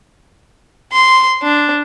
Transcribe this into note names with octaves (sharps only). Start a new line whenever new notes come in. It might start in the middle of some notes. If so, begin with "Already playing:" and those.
C6
D4